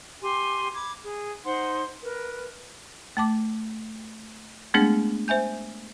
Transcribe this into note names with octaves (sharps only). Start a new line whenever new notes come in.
G4 G#5 C6
B5 D6 G#6
G#4
D#4 C5 F#5 C6
A#4 B4
A3 A5 D6
G#3 A3 B3 C4 D4 G#4
C5 E5 G#5 G6